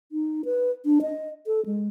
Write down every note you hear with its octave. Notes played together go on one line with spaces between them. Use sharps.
D#4
B4
D4
D#5
A4
G#3